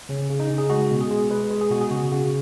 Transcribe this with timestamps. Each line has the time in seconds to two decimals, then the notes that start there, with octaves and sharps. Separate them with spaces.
0.09 C#3 C#4
0.30 C#3
0.40 D#4
0.50 C#3
0.58 G#4
0.70 G#3 F#4
0.91 B2
1.01 G#4
1.11 G#3
1.31 G#3 B4
1.51 G#3
1.61 G#4
1.71 B2 F#4
1.81 G#4
1.91 C#3 F#4
2.12 C#3 F#4